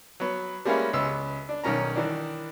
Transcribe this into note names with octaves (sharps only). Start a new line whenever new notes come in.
F#3 B3
G3 G#3 A#3 B3 C#4 E4
C#2 B3 E6
D4
B1 D#3 C#4 A#5
D#3 E3 D4